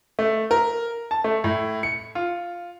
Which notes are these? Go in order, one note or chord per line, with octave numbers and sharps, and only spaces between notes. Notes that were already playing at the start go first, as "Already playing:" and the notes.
A3
A#4
A5
A3
A2
C#7
F4